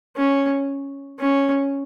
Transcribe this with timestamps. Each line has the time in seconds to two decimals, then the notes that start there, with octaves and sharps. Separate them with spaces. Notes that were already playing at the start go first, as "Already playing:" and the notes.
0.17 C#4
1.20 C#4